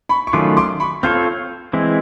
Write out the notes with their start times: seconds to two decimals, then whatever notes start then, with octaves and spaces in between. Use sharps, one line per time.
0.09 B5 C#6
0.27 C#6
0.33 D#3 F#3 A3 C#4 F4 C6 D6
0.57 C6 D6
0.80 B5 C#6
1.03 C4 F4 A4 C#5 F6 G6
1.73 E3 G#3 C4 E4